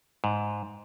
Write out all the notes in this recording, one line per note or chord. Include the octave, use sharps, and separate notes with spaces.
G#2